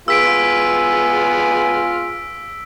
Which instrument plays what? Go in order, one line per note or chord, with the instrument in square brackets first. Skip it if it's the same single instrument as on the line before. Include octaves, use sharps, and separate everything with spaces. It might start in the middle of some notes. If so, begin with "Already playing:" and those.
[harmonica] B3 F4 G#4 [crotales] E6 B6 D7